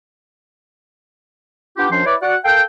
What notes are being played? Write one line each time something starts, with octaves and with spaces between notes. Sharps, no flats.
B3 D4 F4 G4
F#2 F3 C#4 D4 C5 C6
E4 B4 C#5 D5
F#4 D5 F#5
A4 A#4 F5 G5